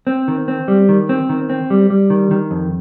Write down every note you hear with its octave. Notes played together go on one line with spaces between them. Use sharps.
C4
D#3
C4
G3
D#3
C4
D#3
C4
G3
G3
D#3
D#3
F2